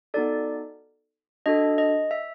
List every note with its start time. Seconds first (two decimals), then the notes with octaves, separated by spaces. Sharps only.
0.14 B3 D#4 F#4 A4 D5
1.46 D4 F#4 A4 D#5
1.78 D#5
2.11 E5